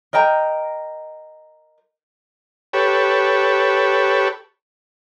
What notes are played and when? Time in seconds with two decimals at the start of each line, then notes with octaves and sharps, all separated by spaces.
0.13 A#4 D#5 G5 A#5
2.73 G4 A4 B4 C#5